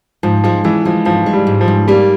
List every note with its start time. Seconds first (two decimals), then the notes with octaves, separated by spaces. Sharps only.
0.23 G#2 F3
0.44 F3 G#3
0.64 E3 G#3
0.85 F3 G#3
1.05 G#2 F3
1.26 G#3
1.33 G3
1.47 G#2
1.61 F3
1.68 G#2
1.88 G3 A#3